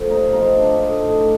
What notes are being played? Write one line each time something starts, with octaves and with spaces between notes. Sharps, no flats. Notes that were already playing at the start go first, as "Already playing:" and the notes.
Already playing: F3 A3
C3 D#4 D#5
F5
C4 D#4 D#5
D4
A3
A2